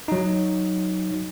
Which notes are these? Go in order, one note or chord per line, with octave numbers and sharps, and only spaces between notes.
F#3 D#4